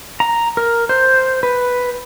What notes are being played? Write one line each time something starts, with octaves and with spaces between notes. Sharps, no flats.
A#5
A#4
C5
B4